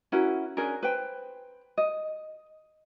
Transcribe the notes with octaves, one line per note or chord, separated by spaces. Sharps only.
C#4 E4 F#4 A#4
C#4 D4 G#4 A#4
B4 C5 G5
D#5